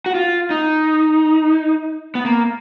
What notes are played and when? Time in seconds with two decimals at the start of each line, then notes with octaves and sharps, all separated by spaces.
0.06 F#4
0.15 F4
0.50 D#4
2.15 B3
2.25 A#3